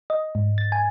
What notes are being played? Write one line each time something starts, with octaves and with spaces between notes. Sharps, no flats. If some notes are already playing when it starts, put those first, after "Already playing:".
D#5
G#2
A6
G#5